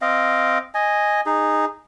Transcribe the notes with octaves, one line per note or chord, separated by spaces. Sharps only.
C4 D#5 F5
D#5 G#5
D#4 G#4